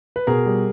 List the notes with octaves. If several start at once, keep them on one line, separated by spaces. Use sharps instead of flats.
B4
B2 G#4 A#4
G3